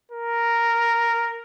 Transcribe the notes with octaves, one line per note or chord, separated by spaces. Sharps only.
A#4